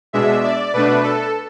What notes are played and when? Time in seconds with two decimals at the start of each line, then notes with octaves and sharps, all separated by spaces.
0.13 B2 G#3 D4 E5
0.43 D5
0.74 B2 A3 D4 B4
1.03 A4